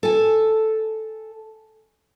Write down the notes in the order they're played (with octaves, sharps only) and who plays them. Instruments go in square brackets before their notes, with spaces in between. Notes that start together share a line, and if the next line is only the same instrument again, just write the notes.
[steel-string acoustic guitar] A4 G#5